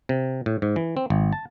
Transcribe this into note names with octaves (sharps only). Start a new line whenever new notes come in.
C3
A2
G#2
E3
C4
G#1
A5